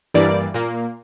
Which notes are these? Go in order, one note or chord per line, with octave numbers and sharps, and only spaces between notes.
G2 E3 G3 A#3 D5
A#2 A#3